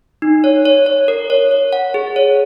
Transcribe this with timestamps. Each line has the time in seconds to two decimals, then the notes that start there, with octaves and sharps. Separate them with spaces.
0.22 D#4
0.44 C#5
0.65 C#5
0.86 C#5
1.08 A#4
1.30 C#5
1.51 C#5
1.73 F#5
1.94 G#4
2.16 C#5